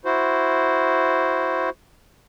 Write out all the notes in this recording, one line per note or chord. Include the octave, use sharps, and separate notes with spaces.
E4 F#4 C5